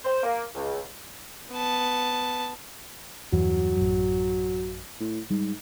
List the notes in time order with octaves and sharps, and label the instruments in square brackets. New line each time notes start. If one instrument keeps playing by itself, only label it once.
[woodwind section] C5
A#3
C#2
[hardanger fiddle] B3 A5
[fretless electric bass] E2 G2 E3 [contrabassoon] F#3
[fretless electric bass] A1 F#2
[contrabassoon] A2
[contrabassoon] G#2 [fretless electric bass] G3